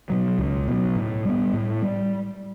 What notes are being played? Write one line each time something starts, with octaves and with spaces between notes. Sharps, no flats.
B2 F#3
C#2
B2 F#3
A2
G3 B3
A2
G3